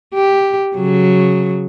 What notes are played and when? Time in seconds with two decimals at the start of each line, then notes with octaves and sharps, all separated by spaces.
0.14 G4
0.75 C#3 F#3